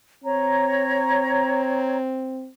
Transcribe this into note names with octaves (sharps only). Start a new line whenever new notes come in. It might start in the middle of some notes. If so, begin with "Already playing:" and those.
C4 C#5 A#5